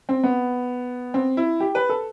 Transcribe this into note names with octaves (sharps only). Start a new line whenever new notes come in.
C4
B3
C4
E4
G4
B4
A4